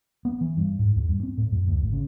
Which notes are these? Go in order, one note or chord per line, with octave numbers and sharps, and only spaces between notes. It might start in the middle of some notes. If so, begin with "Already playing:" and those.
B3
E3
G2
G#2
E2
G2
C4
A2
F#2
D2
G#1
C#3